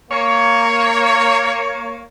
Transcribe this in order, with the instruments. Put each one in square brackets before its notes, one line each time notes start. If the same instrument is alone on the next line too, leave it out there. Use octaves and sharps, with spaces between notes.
[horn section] A#3 C#5